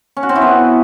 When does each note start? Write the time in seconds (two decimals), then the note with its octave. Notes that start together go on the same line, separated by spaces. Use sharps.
0.17 C#4
0.23 F#4
0.29 C4
0.36 E4
0.42 B3